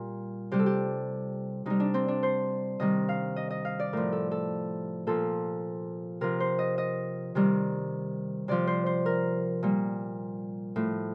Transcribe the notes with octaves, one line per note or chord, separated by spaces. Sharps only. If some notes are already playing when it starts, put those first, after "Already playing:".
Already playing: A#2 G3
C3 G3 G4
A4
G4
C3 G3 D#4
D4
C4
D4
C5
C3 D#3 G3 D#5
F5
D#5
D#5
F5
D5
A2 F3 A#4
A4
A4
A#2 F3 A4
C3 F3 A#4
C5
D#5
D#5
C3 D#3 G3
C3 F3 D5
C5
C5
A#4
A#2 G3
A2 F3